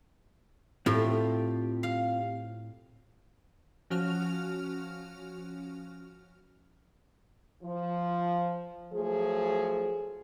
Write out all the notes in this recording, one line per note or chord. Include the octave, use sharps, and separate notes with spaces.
A2 C4 F4 G4
F5
F3 C#4 F#4 F6 F7
F3
F3 F#3 A3 G#4